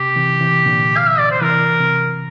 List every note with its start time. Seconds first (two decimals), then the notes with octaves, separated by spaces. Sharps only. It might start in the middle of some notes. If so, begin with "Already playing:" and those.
Already playing: C3 G4
0.16 C3 E3
0.41 C3 E3
0.66 A#2 D3
0.97 F5
1.08 E5
1.19 D5
1.31 C5
1.42 C3 E3 A#4
1.80 C3